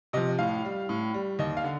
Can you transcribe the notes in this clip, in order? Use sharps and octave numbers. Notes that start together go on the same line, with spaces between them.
C3 F3 D#5
A2 F5
G3
A2
G3
D#2 D#5
F5
D3